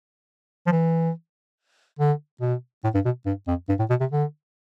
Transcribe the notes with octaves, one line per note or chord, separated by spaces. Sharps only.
F3
E3
D3
B2
A2
G2
B2
G2
F2
G2
A2
B2
C3
D3